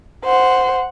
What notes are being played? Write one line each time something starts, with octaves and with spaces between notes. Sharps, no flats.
C5 F#5